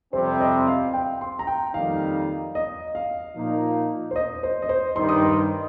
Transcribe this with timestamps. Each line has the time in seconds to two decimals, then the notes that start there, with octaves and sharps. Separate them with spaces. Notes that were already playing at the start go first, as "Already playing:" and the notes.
0.13 F2 C3 G3 C4 C5
0.40 D#5
0.67 F5
0.94 G5
1.21 C6
1.39 A#5
1.47 G5
1.74 F2 D#3 G3 A#3 D#4 F5
2.55 D#5
2.95 F5
3.36 A#2 F3 A#3 D#4
4.11 C5
4.16 D#5
4.43 C5
4.62 D#5
4.69 C5
4.96 G2 D#3 G3 D#4 C6
5.09 D#6
5.21 C6